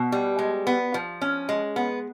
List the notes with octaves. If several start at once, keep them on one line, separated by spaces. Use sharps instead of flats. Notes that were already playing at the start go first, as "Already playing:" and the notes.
Already playing: B2
G3
G#3
B3
F3
C#4
G#3
B3